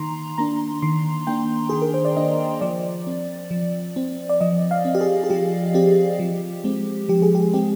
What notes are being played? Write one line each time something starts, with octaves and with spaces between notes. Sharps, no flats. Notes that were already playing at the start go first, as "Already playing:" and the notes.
Already playing: D#3 A#3 A#5 C6
A#3 D4 A#5
D#3 C6
A#3 D4 G5
D#3 G#4
A#4
C5
D5
A#3 D4 D#5
F3 D5
C4
F3
C4
D5
F3 D#5
F5
C4
G4
G#4
G#4
F3 G4
C4 G4
F3
G#3 C4
F3 G4
G#4
G4
G#3 C4 G4